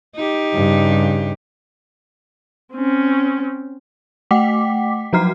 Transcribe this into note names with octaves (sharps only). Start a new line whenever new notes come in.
D#4 G4
G2 C#3
C4 C#4
A3 F#5 G5 D6 B6
F3 F#3 F#4 A#5 F6 C7